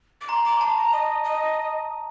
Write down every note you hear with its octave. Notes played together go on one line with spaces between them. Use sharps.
D6
A#5 C6
A#5 D6
A5 C6
A#5
D#5
D#5